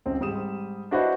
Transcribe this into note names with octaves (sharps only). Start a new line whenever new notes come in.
C#2 C4
G#2 G3 D#6 E7
D4 E4 F#4 B4 C5 D#5